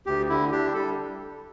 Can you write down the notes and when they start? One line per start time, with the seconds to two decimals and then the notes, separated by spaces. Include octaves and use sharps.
0.06 D2 G4
0.29 D3 E4
0.51 D4 G4
0.74 G3 A4